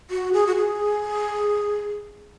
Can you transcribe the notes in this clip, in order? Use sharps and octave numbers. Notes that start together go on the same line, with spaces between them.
F#4
G#4
F#4
G#4